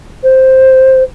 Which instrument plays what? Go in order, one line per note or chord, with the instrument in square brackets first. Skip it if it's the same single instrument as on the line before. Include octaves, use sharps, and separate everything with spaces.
[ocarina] C5